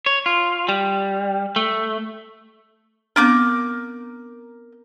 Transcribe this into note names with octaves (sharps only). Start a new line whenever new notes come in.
C#5
F4
G3
A3
B3 C4 D4 A#4 D6 G6